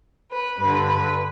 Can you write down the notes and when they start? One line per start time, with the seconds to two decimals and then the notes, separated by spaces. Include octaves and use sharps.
0.30 B4
0.58 G2 D3 B4
0.87 B4